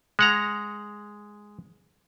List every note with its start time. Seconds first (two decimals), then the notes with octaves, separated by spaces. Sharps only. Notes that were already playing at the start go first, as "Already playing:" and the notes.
0.19 G#3 F#5 A#5